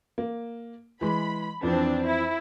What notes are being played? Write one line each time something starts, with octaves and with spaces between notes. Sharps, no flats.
A#3
E3 G#3 B5
F2 E3 F3 C4 D4
E4